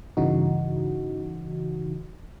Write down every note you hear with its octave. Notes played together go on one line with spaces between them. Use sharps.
G2 C#3 E3 D#4 F#4